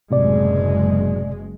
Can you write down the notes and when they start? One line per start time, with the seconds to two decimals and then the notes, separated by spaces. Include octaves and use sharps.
0.11 F#1 A2 C3 G#3 D5